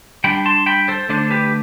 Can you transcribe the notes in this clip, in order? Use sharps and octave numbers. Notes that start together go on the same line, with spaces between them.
G3 D4 G5 B5
A5 C6
G5 B5
A4 C5
D3 A3 D4 A4 C5
G4 B4